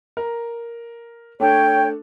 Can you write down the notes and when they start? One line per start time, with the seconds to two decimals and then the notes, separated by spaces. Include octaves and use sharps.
0.17 A#4
1.40 A3 D4 A4 C#5 G5